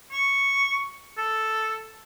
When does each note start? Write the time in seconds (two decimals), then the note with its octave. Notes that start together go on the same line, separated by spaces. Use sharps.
0.12 C#6
1.18 A4